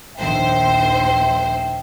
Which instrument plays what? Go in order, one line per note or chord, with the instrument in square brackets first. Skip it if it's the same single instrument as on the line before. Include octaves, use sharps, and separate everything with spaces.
[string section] A#1 D#2 C5 [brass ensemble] A3 E5 G5